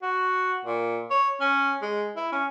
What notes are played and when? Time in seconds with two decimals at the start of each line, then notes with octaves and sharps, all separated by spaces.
0.03 F#4
0.65 A#2
1.11 C#5
1.41 C#4
1.82 G#3
2.16 E4
2.32 C#4